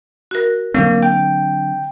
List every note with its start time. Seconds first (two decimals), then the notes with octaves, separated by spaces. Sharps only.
0.31 F#4 A#4
0.74 D3 F#3 A#3 C4
1.03 G5